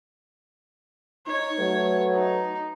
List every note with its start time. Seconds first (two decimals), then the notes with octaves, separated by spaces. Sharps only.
1.27 D#4 C#5
1.59 F#3 A3 B4
2.16 D#4